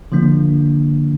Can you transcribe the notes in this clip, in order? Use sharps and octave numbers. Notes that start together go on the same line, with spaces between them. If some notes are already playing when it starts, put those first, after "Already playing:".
D3 F3 A#3 D4